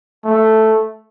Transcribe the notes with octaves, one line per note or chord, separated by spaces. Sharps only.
A3